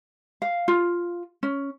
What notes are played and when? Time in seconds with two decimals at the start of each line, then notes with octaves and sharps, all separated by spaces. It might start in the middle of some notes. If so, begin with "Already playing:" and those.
0.42 F5
0.68 F4
1.43 C#4